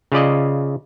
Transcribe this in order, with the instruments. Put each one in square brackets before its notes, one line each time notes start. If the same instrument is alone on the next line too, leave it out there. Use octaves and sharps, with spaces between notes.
[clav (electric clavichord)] C#3 F4 D5 D#5